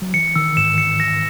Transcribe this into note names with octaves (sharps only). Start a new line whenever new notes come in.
F#3
E3 C#7
D#3 E6
G#2 E7
C#7
A#6